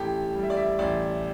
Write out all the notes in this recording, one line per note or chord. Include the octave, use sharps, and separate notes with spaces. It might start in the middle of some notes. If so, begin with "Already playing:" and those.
Already playing: A1 A2 G4 A4
G3
E5
D5
E5
A1 D5